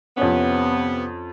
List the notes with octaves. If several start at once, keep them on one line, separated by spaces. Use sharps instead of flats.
F2 C3 B3 C#4